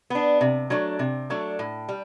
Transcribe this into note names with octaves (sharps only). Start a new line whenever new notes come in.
B3 D4
C3
F#3 A3 D4
C3
F#3 A3 D4
A2
G3